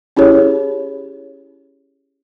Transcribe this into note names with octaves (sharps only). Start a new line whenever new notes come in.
C#4 E4 G4 G#4 C#5